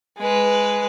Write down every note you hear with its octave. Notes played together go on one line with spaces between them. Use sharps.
G#3 B4